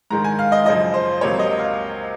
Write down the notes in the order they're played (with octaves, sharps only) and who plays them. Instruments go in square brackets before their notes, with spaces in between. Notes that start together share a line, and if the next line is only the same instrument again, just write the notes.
[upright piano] G#2 D#3 G#3 A#5
G#5
F5
D#5
F#2 C#3 F3 D#5
C5
C#2 C3 F#3 A#3 C#5
D#5
F5